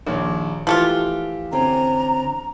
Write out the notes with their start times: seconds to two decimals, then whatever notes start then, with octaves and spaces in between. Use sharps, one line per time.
0.06 A#1 D#2 C#5
0.67 E3 F3 A3 F4 G4 F6
1.52 D3 C4 C#4 A#5